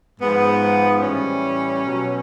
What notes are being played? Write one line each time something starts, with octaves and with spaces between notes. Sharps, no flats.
G#2 F3 B3
A2 E3 G3 C#4
B2 F#3